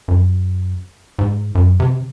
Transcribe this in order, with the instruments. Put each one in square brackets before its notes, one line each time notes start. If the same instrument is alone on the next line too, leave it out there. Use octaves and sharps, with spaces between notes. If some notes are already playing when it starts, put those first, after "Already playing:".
[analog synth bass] F#2
G#2
F#2
C3